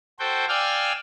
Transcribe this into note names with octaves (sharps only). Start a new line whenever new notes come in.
F#4 A4 C5 G5
D5 F5 G5 G#5 E6 F6